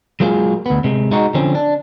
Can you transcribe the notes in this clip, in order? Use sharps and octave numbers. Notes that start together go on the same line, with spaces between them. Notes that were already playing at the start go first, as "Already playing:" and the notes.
F#3 G#3 A#3 F4 G#4
D2 B3
C3 G#3
G#3 D#4 F#4
D3 F3 C4 C#4
D4